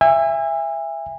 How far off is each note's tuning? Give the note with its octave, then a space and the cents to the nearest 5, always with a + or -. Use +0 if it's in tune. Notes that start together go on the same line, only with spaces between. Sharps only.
E5 +15 G#5 -35